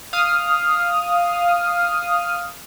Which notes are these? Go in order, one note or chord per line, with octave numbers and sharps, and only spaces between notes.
F5 D#6 F6